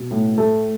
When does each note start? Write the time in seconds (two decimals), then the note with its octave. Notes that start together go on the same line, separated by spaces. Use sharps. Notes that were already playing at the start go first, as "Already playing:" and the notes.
Already playing: B2
0.11 A2
0.38 A3